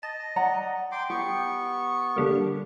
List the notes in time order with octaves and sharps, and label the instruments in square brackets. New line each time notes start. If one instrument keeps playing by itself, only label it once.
[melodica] D#5 [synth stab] A5
[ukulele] D5 F#5 A#5
[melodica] G5 C6 D6
[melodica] B3 C#6 [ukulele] G4
[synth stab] D3 G3 A#3